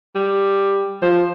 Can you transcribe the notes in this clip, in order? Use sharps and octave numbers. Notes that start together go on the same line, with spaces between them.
G3
F3 C5